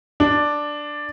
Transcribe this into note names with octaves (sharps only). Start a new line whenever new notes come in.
D4